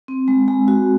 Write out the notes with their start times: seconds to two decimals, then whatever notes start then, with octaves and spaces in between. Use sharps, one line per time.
0.08 C4
0.28 G#3
0.48 G#3
0.68 F#4